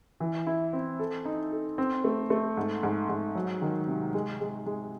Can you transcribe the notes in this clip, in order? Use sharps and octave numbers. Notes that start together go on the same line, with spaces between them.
E3
E4
C4
A4
D#4
A4
C4
A3
A3
G#2
G#2
G#2
F#3
D#3
C3
G#3
G#3
G#3